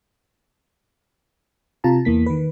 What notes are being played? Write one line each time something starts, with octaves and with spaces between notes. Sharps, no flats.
C3 F4 A5 A#5
E2 E3 A#3 B6
D#3 B4